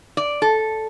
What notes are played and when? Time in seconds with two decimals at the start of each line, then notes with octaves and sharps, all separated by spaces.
0.17 D5
0.42 A4